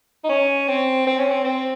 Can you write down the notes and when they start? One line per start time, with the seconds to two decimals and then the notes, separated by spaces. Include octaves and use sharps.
0.24 D#4
0.29 C#4
0.68 C4
1.07 C4
1.18 C#4
1.30 C4
1.44 C4